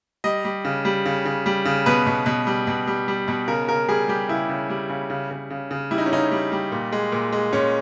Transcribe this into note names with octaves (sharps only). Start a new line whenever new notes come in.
G3 D#5
G3
C#3
G3
C#3
C#3
G3
C#3
B2 B4
B2
B2
G3
B2
G3
G3
B2
C#3 A#4
C#3 A#4
G3 G#4
G3 G4
C#3 E4
C#3
G3
C#3
C#3
C#3
C#3
C#3
G3 E4
D#4
C#4
C#3 D#4
G3
G3
A#2
G#3
A#2
G#3
A#2 C#4